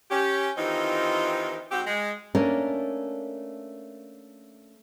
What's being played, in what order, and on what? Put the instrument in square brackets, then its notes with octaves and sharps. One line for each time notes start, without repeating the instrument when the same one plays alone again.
[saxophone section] C#4 G4
D#3 E3 C4 D#4 F4 G4
G#2 C4 F#4 G4
G#3
[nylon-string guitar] A3 A#3 C#4 D4 A#4